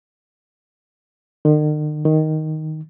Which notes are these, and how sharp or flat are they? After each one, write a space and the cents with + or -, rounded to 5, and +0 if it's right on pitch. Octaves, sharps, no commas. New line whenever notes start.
D#3 -45
D#3 +5